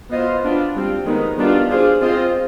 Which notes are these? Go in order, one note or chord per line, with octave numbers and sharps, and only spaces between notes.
B3 F4 C5 D#5
B3 D4 F4
G3 C4 F4
D#3 G#3 B3 D#4
D#3 G3 B3 D4 F4
D4 F4 G#4 C5
C4 F4 G#4 C5 D#5